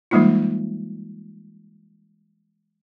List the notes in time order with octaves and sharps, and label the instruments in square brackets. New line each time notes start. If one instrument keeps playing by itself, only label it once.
[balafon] E3 G3 G#3 A#3 D#4 F4